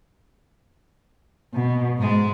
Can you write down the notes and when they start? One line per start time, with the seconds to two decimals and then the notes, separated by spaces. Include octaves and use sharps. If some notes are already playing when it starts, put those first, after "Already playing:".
1.54 B2
1.98 G#2 G#3